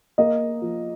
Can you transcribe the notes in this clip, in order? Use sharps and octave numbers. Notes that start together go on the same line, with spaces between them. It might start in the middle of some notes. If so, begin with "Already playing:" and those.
A#3 D#5
F3